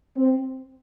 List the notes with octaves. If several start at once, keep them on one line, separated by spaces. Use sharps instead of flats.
C4